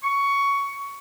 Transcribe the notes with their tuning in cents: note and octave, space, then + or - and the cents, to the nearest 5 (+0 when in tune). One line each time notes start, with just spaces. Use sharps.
C#6 +15